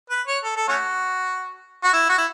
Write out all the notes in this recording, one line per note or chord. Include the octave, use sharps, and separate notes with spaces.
B4
C#5
A4
A4
A3 C#4 F#4
F#4
E4
F#4
E4